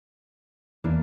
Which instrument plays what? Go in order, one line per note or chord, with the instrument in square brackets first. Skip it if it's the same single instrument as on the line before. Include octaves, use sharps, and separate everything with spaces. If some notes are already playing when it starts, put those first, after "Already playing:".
[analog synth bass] E2 [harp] E3 A#3 D4